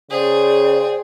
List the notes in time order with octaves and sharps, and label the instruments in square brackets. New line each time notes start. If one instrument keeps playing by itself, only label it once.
[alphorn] C#3 [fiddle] G#4 [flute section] C5 D5 G5